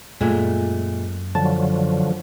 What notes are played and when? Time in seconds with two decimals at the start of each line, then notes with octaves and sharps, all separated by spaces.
0.21 F#2 A#2 G#3 A3
1.35 D3 F3 F#3 A5